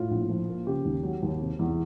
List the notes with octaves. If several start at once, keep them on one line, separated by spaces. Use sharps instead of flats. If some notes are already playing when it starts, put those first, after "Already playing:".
Already playing: A2 F4
A#1
F3
A#3
C#3 G4
D#2
F#3
D#2
C3
E2